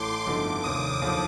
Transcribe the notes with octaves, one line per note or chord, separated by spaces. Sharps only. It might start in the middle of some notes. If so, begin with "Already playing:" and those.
Already playing: A1 A2 A3 C6 D6
G1 F2 D3 A3 D#4
F1 D#2 D#3 D#6
D#2 D3 F3